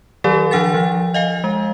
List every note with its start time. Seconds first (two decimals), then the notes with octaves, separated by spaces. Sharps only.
0.24 D#3 F#3 G4 A4 D5
0.51 D#3 F3 D4 F#5 G#5 A6
0.74 F3
1.14 D#5 F5 G#5
1.44 G#3